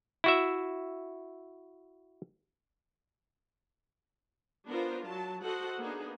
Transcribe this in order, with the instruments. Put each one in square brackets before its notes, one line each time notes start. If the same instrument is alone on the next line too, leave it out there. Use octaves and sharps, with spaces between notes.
[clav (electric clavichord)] E4 F#4 E5
[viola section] B3 D4 F4 A#4 C5
F#3 A5
F#4 A4 C5 D#5 F#5
A#3 B3 D4 D#4 G#4